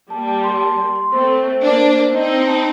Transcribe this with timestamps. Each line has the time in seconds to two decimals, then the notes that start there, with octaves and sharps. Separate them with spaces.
0.10 G3 A#3 A5
0.28 A5
0.44 C6
0.61 A5
0.78 C6
0.96 C6
1.11 A3 C4 C5
1.28 C5
1.46 C5
1.62 A#3 D4 C5
1.80 C5
1.97 C5
2.13 C4 D#4 D#5
2.30 C5
2.47 A5